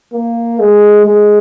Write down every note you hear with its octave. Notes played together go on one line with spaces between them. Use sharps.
A#3
G#3
G#3